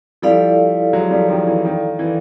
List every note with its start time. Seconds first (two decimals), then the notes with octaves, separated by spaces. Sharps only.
0.22 F3 G3 E4 A4 D5 F5
0.93 F#3 G#3
1.11 F3 G3
1.28 D#3 F3
1.47 E3
1.65 D#3
1.99 E3